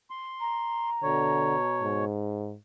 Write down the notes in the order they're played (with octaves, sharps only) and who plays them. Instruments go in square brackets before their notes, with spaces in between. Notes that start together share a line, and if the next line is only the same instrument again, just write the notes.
[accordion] C6
[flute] A#5
[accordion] B2 C#5 [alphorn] D3
[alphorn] G#2